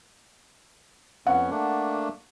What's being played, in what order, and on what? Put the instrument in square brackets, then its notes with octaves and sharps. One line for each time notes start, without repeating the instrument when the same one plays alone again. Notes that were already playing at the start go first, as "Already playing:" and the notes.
[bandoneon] F2 B3 C#4 [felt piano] F#5
[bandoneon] A3 A#3 D4